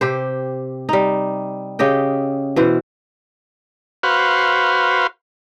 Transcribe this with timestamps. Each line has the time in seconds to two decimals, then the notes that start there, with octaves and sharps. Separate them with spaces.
0.01 C3 G4 C5
0.89 G3 D#4
1.79 C#3 G4 D#5 G5
2.56 B2 E3 C5
4.03 F#4 B4 C5 F5